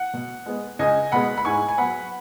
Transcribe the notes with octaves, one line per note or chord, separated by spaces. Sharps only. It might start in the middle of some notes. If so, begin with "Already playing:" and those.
Already playing: F#5
B2
G#3 B3
C#2 D#5 G#5
B2 G#3 B3 F#5 B5
B5
G#2 G#5 C#6
G#5
F#3 B3 F#5 B5